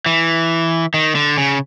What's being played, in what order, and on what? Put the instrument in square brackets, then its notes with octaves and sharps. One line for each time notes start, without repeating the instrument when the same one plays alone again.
[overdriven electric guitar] E3
D#3
D3
C#3